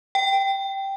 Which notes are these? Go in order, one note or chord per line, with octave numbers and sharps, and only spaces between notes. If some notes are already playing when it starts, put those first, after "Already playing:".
G5